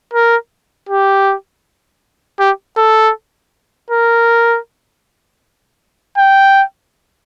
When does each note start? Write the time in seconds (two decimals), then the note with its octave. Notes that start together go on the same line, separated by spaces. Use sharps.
0.13 A#4
0.89 G4
2.39 G4
2.77 A4
3.91 A#4
6.18 G5